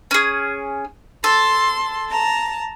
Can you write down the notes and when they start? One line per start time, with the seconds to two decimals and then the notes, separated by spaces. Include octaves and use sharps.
0.11 C#4 G#4
1.24 A4 C6
2.10 A5 A#5